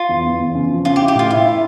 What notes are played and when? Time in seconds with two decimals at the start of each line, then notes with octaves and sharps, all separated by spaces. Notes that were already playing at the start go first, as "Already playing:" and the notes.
Already playing: F4
0.09 E2
0.24 E2
0.40 E2
0.55 C#3
0.70 F3
0.85 C#4 F4
0.96 G4
1.00 E4
1.08 G4
1.15 A2 F4
1.31 E4 F4
1.45 E4